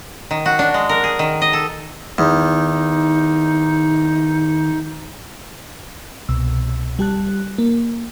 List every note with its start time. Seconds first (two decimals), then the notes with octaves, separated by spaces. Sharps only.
0.31 D#3
0.46 F#4
0.59 D4
0.74 G#3
0.89 A#4
1.04 G#4
1.19 D#3
1.42 D#5
1.53 A4
2.18 E2 D#3 D#4
6.29 C2 B2 E6
6.99 G3 G4 A5 F#6
7.58 A#3